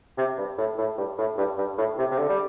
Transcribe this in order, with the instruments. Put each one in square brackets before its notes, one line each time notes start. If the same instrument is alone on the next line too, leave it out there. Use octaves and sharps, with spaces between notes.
[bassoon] C3
G2
A2
A2
G2
A2
G2
G2
A2
C3
C3
D3
G3